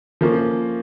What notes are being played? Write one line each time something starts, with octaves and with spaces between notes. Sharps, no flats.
F3 A#3 C#4